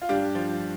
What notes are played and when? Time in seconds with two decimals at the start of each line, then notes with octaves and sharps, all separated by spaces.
0.02 F4
0.09 G2 D4 G4
0.35 F3